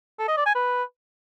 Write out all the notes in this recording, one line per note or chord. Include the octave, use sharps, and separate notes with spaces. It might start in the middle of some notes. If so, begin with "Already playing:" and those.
A4
D#5
D5
G#5
B4